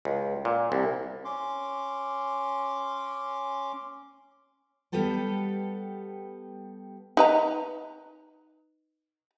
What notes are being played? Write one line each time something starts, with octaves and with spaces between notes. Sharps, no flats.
C#2
A#2
C2
C#4 C6 D6
G3 B3 G4 A4 B4
D#4 B4 A#5